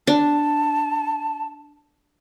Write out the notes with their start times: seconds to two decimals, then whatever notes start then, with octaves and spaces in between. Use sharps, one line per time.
0.07 D4 A5